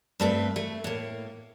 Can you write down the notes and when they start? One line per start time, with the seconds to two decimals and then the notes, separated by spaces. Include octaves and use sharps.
0.20 G2 A3 C4 B4
0.56 A3
0.84 A2 A#3